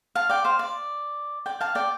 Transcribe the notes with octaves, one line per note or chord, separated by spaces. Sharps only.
F5 A5
D5 G5
C5 F5
D5
D5 G5
F5 A5
D5 G5